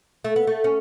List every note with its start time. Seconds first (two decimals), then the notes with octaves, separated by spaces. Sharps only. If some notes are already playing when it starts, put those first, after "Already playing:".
0.24 A3
0.36 B3
0.47 A3
0.64 C#4